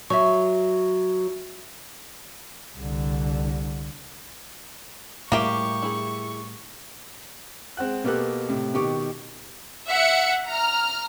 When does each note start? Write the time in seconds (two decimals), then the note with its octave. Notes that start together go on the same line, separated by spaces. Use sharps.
0.10 F#3 E5 C#6
2.77 C2 D3
5.32 A2 G3 A#3 G4 G#4 E5 C#6
5.82 E4 G#4
7.77 G#3 C4 F#5 F#6
8.04 B2 A#3 B3 G4 A4 F#6
8.48 A2 C3
8.74 B2 D#3 G4 C#6 D6
9.88 E5 F#5 C#7
10.47 A#5 F6